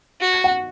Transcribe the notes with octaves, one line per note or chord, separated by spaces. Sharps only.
F#4
F#5